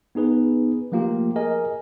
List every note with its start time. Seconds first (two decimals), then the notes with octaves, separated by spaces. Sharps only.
0.15 B3 D#4 G#4 B4
0.92 F3 A3 A#3 F4 G4
1.36 G#4 A#4 D#5 G#5